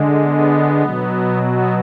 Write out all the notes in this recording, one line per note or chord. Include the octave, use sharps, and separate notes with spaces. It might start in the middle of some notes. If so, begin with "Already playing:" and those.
Already playing: D3 G#3
B3
B2 F#3
B3